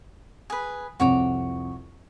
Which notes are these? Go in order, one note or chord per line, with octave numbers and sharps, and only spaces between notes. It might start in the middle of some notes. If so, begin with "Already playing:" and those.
G#4 B4
C2 F2 F#4 C#5 D6